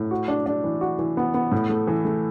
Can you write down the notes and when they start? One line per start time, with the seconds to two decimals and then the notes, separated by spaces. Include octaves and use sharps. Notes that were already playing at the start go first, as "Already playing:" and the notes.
Already playing: A2
0.11 F#4
0.28 D4
0.46 D4
0.64 E3
0.81 F#4
0.99 E3
1.17 B3
1.34 B3
1.52 A2
1.69 A3
1.87 E3
2.05 A3